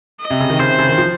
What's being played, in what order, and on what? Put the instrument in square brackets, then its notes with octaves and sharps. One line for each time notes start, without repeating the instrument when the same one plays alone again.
[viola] D#5
[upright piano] C3
C#3
D#3
[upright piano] C#3 [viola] C5
[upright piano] C3
C#3
D#3
F3